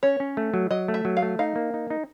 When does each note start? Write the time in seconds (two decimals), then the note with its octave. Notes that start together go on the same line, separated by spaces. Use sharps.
0.03 C#4 C#5
0.20 C#4
0.37 A3
0.54 F#3
0.71 F#3 D#5
0.88 A3
0.94 E5
1.05 F#3
1.17 F5
1.22 A3
1.39 D#4 F5
1.56 A#3
1.74 D#4
1.90 D#4